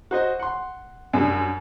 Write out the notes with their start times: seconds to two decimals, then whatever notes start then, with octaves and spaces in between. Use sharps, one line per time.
0.11 F#4 C5 D#5
0.39 F#5 C6
1.13 F#2 G3 D4